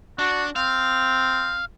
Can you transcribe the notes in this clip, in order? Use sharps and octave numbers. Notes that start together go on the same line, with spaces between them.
D4 F#4
C4 F5